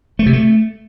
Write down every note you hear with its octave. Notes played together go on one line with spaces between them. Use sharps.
A3
C3
A3